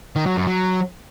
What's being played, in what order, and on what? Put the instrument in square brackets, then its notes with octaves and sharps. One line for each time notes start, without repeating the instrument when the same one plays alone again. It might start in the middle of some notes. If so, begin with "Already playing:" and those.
[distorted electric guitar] D#3
F#3
F#2
F#3